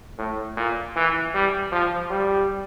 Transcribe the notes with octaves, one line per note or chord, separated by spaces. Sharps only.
A2
A#2
E3
G3
F3
G3